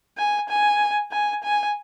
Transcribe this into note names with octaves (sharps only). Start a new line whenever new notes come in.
G#5
G#5
G#5
G#5